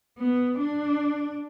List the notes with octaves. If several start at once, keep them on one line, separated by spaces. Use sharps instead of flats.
B3
D4